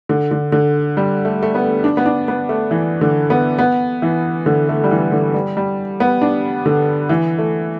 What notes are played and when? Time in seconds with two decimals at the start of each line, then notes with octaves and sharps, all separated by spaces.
0.09 D3
0.31 D3
0.52 D3
0.97 G3
1.25 A3
1.43 A3
1.55 B3
1.84 D4
1.97 B3
2.06 D4
2.28 B3
2.49 A3
2.71 E3
3.01 D3
3.30 B3
3.59 B3
4.02 E3
4.46 D3
4.69 A3
4.84 G3
4.91 E3
5.12 D3
5.34 G3
5.57 G3
6.00 B3
6.22 D4
6.66 D3
7.09 E3
7.39 A3